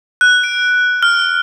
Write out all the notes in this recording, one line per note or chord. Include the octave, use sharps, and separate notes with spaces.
F#6
D7
F6